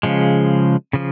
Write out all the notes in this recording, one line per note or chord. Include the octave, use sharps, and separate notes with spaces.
C#3 F3 G#3
C#3 F3